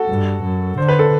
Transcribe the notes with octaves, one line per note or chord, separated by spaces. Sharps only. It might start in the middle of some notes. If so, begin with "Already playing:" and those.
Already playing: F#4 A4
G2
F#2
D3 C5
B4
A4